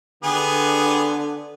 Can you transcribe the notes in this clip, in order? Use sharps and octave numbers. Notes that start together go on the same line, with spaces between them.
D3 B3 G4 G#4